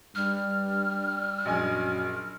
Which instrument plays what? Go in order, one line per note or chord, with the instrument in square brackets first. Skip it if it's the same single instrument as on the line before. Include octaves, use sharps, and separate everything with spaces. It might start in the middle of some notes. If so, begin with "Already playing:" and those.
[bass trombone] G2 [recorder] G3 [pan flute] F6
[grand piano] A#1 D#5 G#5 [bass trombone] F#2